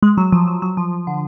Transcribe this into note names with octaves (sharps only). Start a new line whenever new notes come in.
G#3
F#3
F3
F#3
F#3
F3
D3